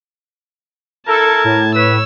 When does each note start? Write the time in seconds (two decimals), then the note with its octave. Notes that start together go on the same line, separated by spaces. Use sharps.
1.08 E4 A4 A#4 A5 G#6
1.44 A2
1.75 B4 C#5 E6